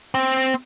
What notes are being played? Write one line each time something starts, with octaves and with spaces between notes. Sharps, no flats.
C4